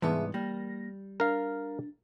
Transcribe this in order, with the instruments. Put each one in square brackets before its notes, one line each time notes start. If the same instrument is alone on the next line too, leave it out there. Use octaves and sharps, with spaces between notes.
[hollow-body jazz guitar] C2 G#2 B3 [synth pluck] E3 [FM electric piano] G#4 E5 A5
[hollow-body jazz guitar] G3 [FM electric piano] A#3 A#6
[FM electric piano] D4 [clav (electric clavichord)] A#4 F5